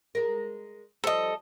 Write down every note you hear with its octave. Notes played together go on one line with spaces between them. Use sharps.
G#3 A#4
F3 G3 C4 A4 D#5